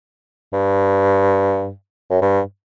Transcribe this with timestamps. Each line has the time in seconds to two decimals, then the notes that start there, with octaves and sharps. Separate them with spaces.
0.53 G2
2.10 F#2
2.22 G2